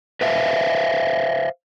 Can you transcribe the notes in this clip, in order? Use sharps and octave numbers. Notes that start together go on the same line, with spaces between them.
B4 C5 E5 F5